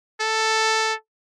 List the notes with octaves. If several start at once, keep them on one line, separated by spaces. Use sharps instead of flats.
A4